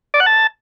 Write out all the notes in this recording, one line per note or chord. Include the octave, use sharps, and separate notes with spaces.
D5
F#5
A5